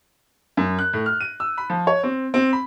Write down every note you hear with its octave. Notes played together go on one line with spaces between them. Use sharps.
F#2
F#6
A2
F6
D#7
E6
B5
F3
C#5
C4
C4
B5